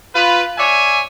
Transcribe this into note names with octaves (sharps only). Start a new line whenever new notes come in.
F4 B4
C#5 D5 E5 G#5